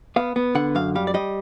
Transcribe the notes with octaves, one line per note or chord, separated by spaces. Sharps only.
B3 F5
B3
D3 F#5
F#2 F5
G3 F5
D5
G3 D#5